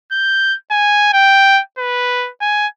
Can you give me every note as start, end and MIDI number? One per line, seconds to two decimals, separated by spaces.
0.12 0.56 91
0.71 1.10 80
1.13 1.61 79
1.78 2.30 71
2.41 2.67 80